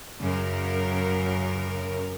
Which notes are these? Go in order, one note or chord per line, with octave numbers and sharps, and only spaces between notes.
F#2 C#3 A#4